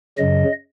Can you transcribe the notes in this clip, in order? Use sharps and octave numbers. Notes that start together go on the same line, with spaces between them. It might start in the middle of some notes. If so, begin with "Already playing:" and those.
F#2 C#3 F#3 D#5